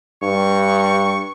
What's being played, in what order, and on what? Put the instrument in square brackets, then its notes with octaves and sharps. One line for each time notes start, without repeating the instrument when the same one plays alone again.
[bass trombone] G2 [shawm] C#6